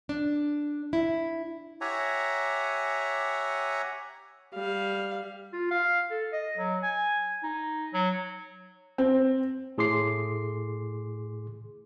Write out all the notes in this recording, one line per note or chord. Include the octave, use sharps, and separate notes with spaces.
D4
E4
G4 C#5 E5 F#5 G#5 A#5
G3 F5
F4
F5
A4
D#5
F#3
G#5
D#4
F#3
C4
A2 G#4 C6 D6 C7